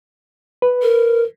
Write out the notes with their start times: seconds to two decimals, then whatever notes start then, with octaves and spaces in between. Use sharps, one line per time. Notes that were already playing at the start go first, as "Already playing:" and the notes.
0.62 B4
0.82 A#4